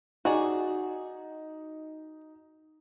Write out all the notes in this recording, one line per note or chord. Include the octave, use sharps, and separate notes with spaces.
D#4 F#4 G#4 D5